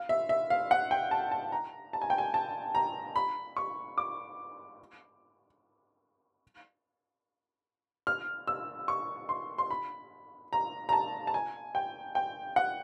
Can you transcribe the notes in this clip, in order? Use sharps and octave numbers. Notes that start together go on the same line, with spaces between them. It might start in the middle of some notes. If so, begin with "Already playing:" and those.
Already playing: F5
E5
E5
F5
F#5
G5
A5
A5
A#5
A5
G#5
G5
G#5
A5
A#5
B5
C#6
D6
F6
E6
C#6
C6
C6
B5
A#5
A#5
A5
A5
G#5
G5
G5
F#5